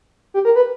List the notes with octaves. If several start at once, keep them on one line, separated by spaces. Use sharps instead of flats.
G4
A#4
B4